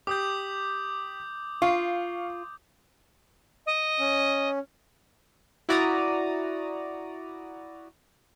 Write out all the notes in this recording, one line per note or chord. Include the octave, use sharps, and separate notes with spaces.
G4 D6 D#6 G6
F4 F5 C#6
D#5
C#4
E4 F#4 D5 A#5 D#6